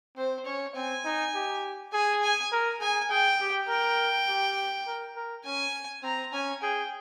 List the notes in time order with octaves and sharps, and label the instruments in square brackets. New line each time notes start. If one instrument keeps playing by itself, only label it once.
[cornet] C4 [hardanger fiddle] C5
[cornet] C#4 [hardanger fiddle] C#5
[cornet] C4 [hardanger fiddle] G#5
[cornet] D#4
G4
[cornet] G#4 [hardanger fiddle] G#5
[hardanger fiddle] G#5
[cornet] A#4
[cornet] G#4 [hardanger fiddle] G#5
[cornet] G#4 [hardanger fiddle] G5
[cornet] G4
[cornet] A#4 [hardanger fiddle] G5
[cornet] G4
A#4
A#4
[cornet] C#4 [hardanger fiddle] G#5
[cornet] C4 [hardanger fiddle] A#5
[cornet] C#4 [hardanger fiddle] G#5
[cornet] G#4 [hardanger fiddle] G5